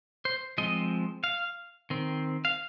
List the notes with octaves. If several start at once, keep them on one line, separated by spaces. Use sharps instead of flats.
C5
F3 G#3 C4 D#5
F5
D#3 C4
F5